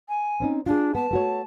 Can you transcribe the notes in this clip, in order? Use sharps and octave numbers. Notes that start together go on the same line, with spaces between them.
G#5
C4 C#4 D#4
D4 F4 G#4
B3 A5
A3 F#4 C#5